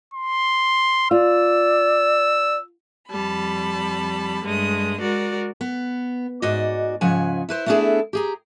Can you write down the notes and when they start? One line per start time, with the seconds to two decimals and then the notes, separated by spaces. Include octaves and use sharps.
0.14 C6
1.11 F4 D5 E6
3.09 F2 G3 A5 B5
4.43 G2 G#3 A3 D#6
5.01 G#3 F#4 A#4 D5
5.61 B3
6.42 G#2 F#4 D5 D#5
7.01 G#2 C#3 F3 F#5 G#5
7.49 E4 B4 C5
7.66 A3 B3 D4 E4 G#4 A4
8.13 G4 G#4 A#5